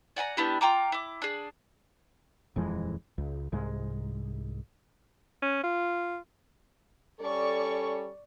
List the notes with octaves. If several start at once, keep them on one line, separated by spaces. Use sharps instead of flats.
D5 F#5 G#5 A#5
B3 D4 E4 G4
F4 G5 A#5 D6
E4 D6
D4 G#4
D#1 F2 E3 G#3
C#2
C2 G#2 G#3
C#4
F4
G3 C#4 A4 D5 C#6